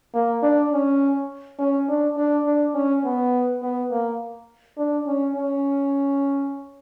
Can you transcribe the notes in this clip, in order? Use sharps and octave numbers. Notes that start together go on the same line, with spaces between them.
A#3
D4
C#4
C#4
D4
D4
D4
C#4
B3
B3
A#3
D4
C#4
C#4